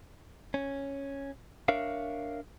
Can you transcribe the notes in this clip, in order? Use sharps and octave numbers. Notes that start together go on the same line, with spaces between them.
C#4
D4 A#4 C#5 E5 F5